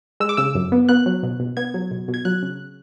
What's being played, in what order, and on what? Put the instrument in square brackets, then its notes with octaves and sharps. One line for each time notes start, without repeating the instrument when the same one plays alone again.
[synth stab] G#3 E6
D6
C#3 E6
F#2
B3
B3 F#6
F#3
B2
B2
B3 G#6
F#3
B2
B2
G#6
F#3 F#6
C#3